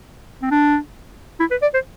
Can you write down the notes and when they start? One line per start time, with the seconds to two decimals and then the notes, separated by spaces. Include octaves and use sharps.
0.42 C4
0.51 D4
1.39 E4
1.51 B4
1.62 D5
1.74 C5